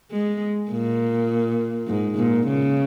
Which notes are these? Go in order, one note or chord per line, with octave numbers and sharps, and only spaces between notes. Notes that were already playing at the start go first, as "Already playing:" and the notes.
G#3
A#2
G#2
A#2
C#3